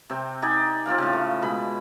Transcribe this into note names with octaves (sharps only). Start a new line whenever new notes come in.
C3 C4
D#4 D5 G5 G#5
C4 F4 D5 F5
A2 C#3
A3
B2 G#3 B5